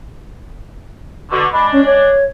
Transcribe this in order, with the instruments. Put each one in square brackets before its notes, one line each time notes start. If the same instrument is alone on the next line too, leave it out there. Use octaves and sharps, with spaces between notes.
[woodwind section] B2 D3 [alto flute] C#6
[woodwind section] G#3 D4 [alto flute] B5
[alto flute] C#4
C#5